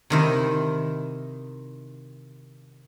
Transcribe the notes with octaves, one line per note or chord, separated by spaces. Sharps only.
C3 D#3 E4